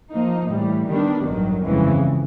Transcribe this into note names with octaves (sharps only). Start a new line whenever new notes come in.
F3 A#3 D#4
A2 E3 G3
D#3 G3 B3 D4
A1 G2 D#3 F#3
G1 F2 C#3 E3 G#3